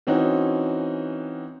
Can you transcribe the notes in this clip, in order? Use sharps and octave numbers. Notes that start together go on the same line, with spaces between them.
E3 C4 C#4 D#4 F#4